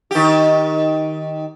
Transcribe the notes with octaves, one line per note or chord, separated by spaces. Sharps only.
D#3 G4